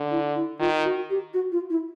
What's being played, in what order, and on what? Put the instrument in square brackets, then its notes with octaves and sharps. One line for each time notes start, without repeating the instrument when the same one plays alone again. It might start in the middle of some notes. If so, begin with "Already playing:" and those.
Already playing: [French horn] D3
[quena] E4
E4
[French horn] D#3 [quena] F4
[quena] F#4
G4
F#4
F4
E4